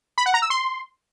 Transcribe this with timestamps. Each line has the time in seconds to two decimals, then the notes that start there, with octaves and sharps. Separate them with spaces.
0.18 B5
0.26 F#5
0.34 A#5
0.42 E6
0.50 C6